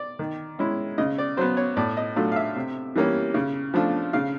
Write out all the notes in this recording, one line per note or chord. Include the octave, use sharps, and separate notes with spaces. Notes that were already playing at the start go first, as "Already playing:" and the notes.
Already playing: D5
D#3
G#3 C#4 E4
C#3 D#5
D5
F#3 B3 C5
C#5
A2 D5
D#5
F#3 A3 D4 F4
F5
E5
C3
E3 G3 A#3 C#4
C#3
F3 A3 D4 F4
C#3 F5